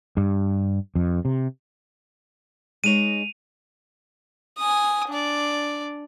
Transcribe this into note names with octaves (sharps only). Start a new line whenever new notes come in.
G2
F2
C3
G#3 D#4 C#5 D#7 F7
G#5 D#6
D4 D5